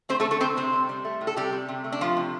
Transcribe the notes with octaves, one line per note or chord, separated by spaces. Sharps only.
A3 C4 C5
A3 A4
D3
A3 A4
C3 C4 C5
C3 C4 C5
G3
G3
A3
A2
A4
C3 G3 G4
C3
C3
A3
D4
C3 F3 F4
C3